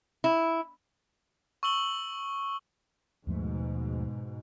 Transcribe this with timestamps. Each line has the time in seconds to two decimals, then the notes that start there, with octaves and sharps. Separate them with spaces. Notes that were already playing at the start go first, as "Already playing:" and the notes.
0.24 E4
1.63 C#6 E6 F#7 G7
3.27 D#2 G#2 B2 F3 A3